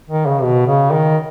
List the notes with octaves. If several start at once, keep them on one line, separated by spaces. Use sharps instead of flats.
D#3
C#3
B2
C#3
D#3